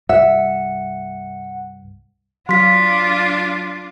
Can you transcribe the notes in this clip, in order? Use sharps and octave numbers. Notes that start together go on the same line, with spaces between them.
C2 G2 E5 F#5
F#3 D4 F4 F5 C6 B6